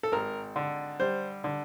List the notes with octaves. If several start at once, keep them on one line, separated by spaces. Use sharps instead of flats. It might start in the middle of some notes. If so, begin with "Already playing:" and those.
A4
G#1 A#4
D3
G3 C5
D3